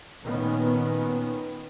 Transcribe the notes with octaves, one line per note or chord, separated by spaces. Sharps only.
A#2 D#3 B3 C#4